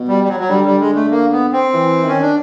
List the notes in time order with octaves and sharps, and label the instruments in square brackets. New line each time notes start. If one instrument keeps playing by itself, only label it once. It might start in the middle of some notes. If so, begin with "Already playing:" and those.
Already playing: [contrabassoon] B2
[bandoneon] G3
G3
F#3
F#3
[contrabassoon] D3 [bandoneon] G3
[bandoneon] G3
G#3
A3
A#3
B3
C4
[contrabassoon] E3
[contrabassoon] D#3 [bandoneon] C#4
[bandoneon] D4